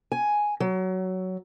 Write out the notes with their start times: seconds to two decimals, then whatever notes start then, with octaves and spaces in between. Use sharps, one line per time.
0.12 G#5
0.60 F#3